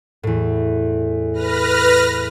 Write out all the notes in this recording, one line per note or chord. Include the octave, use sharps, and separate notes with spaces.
E2 A2
B4 F6 A#6